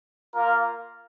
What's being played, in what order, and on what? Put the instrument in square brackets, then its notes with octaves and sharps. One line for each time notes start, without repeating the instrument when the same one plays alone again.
[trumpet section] A#3 F4 A#4 F5